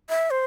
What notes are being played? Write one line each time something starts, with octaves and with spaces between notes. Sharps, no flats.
E5
C5